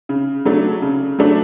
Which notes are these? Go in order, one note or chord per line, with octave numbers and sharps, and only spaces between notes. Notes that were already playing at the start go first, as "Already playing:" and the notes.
C#3
F#3 A3 D4
C#3
F#3 A3 D4